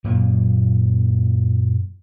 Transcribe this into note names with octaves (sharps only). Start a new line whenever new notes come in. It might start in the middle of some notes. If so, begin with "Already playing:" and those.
F#2 A#2 F#3 A#3